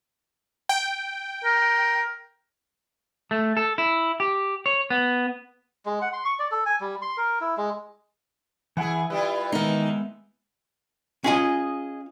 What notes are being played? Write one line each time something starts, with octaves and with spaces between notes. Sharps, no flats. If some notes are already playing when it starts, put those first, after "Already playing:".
G5
A#4
A3
A4
E4
G4
C#5
B3
G#3
F#5
C6
C#6
D5
A4
G#5
G3
C6
A#4
E4
G#3
E3 E4 G#4 F#5 G#5
G3 E4 F4 B4
D#3 E3 G#3 B3 D#4
C#4 F4 G#4 D#5 G#5